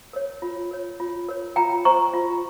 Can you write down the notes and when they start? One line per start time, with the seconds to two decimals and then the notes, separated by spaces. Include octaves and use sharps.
0.13 A#4 C#5
0.42 F4
0.71 A#4 C#5
1.00 F4
1.29 A#4 C#5
1.56 F4 G5 A#5
1.85 C5 A#5 C#6
2.13 F4